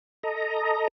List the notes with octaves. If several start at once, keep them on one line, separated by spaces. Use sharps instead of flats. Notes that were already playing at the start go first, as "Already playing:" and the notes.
A4 D#5 A#5